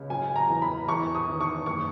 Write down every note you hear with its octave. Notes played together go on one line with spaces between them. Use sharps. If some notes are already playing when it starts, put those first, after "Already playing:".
Already playing: C#2 C#3
F#3 G#5
A#5
E2
B5
E2 C#6
D#6
D#3
C#6
F#1 C#6